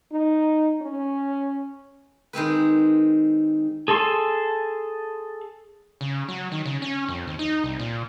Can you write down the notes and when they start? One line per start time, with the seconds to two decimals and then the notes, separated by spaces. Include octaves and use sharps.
0.12 D#4
0.82 C#4
2.33 D#3 G#3 C4 B4
3.88 G#4 A4 A5 C6
6.01 C#3
6.28 F#3
6.52 D#3
6.66 C#3
6.82 C#4
7.08 F2
7.27 D#2
7.39 D#4
7.64 C2
7.80 A#2